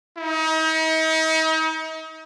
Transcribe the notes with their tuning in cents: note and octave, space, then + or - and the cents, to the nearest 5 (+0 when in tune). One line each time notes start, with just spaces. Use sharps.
D#4 +40